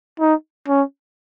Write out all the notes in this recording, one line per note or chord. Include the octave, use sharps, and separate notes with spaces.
D#4
C#4